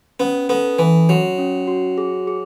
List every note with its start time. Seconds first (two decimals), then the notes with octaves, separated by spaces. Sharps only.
0.20 B3 C#4
0.49 B3 A4
0.79 E3 C#4
1.09 F#3 F#4
1.38 C#4
1.67 F#4
1.98 G#4
2.27 G#4